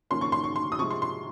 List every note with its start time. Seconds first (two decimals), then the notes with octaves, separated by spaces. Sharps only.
0.10 F2 D#3 A#3 C#4 C6
0.21 C#6
0.32 C6
0.44 C#6
0.56 C6
0.72 D#6
0.78 C3 F3 G#3 C#6
0.90 C6
1.02 C6